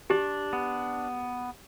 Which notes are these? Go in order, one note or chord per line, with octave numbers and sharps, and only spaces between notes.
D4 G4
B3